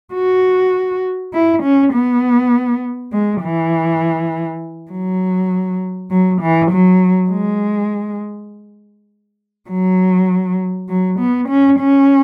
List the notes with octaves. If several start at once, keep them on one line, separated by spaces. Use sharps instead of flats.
F#4
E4
C#4
B3
G#3
E3
F#3
F#3
E3
F#3
G#3
F#3
F#3
B3
C#4
C#4